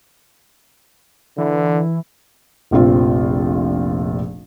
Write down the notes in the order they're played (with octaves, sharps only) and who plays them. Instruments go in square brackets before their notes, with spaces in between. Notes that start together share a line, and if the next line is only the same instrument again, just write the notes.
[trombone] D3 [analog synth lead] E3
[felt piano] F1 A#1 C4 F4